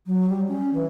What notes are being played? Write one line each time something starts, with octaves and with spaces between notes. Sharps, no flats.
F#3
G3
C#4
E3